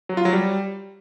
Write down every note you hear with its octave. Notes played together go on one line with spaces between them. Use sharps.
F#3
F4
F#3
G3